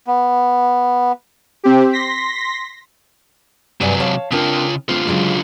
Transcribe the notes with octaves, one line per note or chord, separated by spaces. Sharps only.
B3
C4 G4
C6 A#6 B6
G2 C3 F#3 D5 G#5
C#5 F5 A5
C#3 C4 D4 F4 A#4
D3 A3 C4 F4
C#3 F#3 G#3